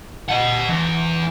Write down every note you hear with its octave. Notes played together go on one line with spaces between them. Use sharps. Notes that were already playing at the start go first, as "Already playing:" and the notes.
D#5 F#5
E2